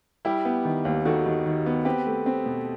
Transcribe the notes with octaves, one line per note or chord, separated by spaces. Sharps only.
G3 E4 G4
B3
D#3
D#2
D#3 F#4 A4
D#3
D#3
B3
C4 G4 B4
A3
C4
B2